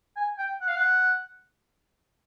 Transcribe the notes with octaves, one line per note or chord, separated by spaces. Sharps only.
G#5
G5
F#5
F5
F#5